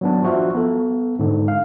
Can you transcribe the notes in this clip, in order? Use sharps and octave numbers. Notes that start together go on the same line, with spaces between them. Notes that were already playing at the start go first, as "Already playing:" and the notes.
F#3 B3 D4
F3 F4 F#4 E5
B3 A4
G#2 D3
F5